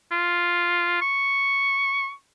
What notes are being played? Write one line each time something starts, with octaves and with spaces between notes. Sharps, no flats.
F4
C#6